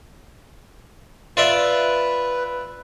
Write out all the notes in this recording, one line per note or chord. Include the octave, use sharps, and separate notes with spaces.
F4 B4 D5 E5